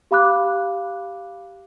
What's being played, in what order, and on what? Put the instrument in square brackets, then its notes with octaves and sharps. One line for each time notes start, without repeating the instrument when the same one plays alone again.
[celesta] G4 F5 B5 D6 F#6